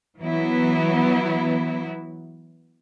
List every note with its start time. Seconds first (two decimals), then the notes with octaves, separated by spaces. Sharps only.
0.19 E3 F#3 B3 E4